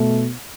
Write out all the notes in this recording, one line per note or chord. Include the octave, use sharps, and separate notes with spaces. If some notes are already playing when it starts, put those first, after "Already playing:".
Already playing: B2 A3